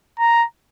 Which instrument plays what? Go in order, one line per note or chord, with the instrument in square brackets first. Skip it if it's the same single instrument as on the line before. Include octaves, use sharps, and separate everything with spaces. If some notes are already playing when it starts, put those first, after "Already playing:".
[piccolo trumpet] A#5